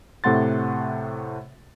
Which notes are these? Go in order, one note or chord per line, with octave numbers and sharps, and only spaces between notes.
A2 C3 A3 F#5 C6 A6